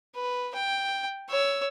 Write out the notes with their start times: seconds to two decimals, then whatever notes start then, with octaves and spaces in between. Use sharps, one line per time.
0.15 B4
0.55 G5
1.29 C#5 E6